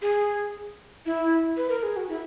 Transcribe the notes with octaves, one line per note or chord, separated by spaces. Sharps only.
G#4
E4
B4
A#4
G#4
F#4
E4